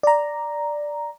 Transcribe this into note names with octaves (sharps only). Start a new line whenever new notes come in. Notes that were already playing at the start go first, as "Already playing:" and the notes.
D5 A#5